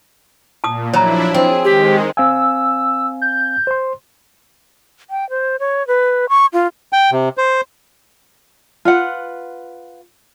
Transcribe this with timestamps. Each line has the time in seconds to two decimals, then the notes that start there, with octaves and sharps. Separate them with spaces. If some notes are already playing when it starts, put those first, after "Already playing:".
0.64 A#2 A5 D#6
0.93 F3 F#3 D4 E4 C#5 A#5
1.34 C4 G#4
1.64 D#3 G#3 G4
2.17 C4 F5 G#5 E6
3.22 G6
3.67 C5 C6
5.10 G5
5.30 C5
5.60 C#5
5.87 B4
6.29 C#6
6.53 F4
6.93 G5
7.12 C3
7.38 C5
8.85 F4 B4 F#5